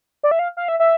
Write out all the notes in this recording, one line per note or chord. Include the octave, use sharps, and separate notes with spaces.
D5
E5
F5
F5
E5
E5